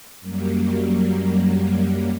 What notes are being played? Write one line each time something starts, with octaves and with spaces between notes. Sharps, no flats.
F#2 F#3 G3 A#3